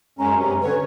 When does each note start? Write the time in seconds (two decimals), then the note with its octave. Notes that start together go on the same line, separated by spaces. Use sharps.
0.19 F#2 G#3 C#4 A#5
0.37 G2 C3 C#4
0.62 D3 B4 C#5